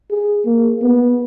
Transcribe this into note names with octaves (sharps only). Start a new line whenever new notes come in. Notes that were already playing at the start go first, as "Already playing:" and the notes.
G#4
A#3
B3